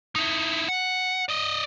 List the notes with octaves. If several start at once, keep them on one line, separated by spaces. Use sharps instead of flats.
D#4 E4
F#5
D5 D#5